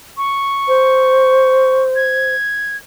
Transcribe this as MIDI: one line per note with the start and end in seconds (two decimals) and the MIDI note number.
0.17 1.83 85
0.68 2.35 72
1.96 2.77 92